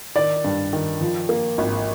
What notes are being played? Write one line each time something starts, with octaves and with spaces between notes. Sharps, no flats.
D#3 D5
G2
D#3
F3
A#3
G#1